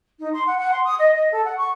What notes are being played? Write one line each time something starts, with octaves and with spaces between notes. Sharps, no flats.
D#4
C6
F#5
F#5
C6
D#6
D#5
D#5
A4
F#5
C#6